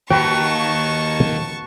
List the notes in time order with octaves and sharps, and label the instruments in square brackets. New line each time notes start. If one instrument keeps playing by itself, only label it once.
[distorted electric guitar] D#2 [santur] F#4 B4 [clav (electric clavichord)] G5 [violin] A5 C#6